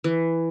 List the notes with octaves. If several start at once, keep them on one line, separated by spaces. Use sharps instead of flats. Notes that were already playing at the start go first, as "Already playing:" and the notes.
E3